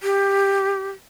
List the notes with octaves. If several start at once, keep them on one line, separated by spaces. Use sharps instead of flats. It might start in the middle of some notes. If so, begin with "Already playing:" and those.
G4